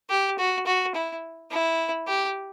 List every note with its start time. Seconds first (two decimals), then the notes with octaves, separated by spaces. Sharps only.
0.10 G4
0.38 F#4
0.66 F#4
0.94 E4
1.51 E4
2.07 G4